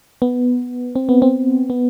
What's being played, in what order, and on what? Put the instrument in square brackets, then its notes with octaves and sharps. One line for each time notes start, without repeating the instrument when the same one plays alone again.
[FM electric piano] B3
C4
B3
C4
B3